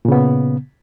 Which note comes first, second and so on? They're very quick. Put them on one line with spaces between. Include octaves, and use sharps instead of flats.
A#2 C#3 B3